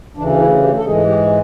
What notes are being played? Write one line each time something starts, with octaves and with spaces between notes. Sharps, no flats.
D2 C#3 E3 D4
E4
G4
A4
G#2 E3 G#3 G#4
G4